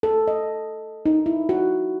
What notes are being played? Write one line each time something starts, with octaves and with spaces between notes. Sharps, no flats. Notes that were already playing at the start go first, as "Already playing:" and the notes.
A4
D#5
D#4
E4
F#4